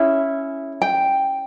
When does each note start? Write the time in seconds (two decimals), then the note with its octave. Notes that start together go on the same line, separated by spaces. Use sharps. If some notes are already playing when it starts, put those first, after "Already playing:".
Already playing: C#4 E4 G#4 E5
0.82 G5